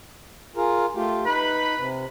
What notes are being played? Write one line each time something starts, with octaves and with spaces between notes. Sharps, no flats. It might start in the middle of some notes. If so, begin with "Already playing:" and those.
F4 G#4 A#4
A3 F4 G4
D#4 B4 B5
C3